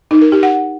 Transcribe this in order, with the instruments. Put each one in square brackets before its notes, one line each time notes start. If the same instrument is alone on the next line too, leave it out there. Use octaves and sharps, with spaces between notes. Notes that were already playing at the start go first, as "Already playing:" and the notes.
[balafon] D#4
A#4
G4
F#5